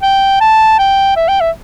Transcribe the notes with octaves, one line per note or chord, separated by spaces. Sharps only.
G5
A5
G5
E5
G5
E5